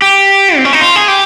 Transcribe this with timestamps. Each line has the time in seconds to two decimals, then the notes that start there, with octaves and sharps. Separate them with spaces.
0.02 G4
0.57 C4
0.65 C#4
0.73 D#4
0.81 F4
0.96 G#4
1.08 G4